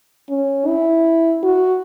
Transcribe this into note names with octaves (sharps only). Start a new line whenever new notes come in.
C#4
E4
F#4